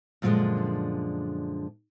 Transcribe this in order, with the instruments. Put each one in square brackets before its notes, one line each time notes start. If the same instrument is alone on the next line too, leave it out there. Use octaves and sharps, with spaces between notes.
[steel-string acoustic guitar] F#2 A#2 D3 F3 G#3 D4